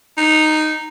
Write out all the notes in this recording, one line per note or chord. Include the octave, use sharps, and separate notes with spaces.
D#4